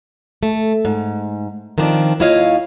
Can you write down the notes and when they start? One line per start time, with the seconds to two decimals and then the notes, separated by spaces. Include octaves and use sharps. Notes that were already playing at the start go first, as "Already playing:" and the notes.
0.43 A3
0.85 G#2
1.78 D#3 F3 C4 D4
2.20 D#2 E4 F4 C#5 D#5 F5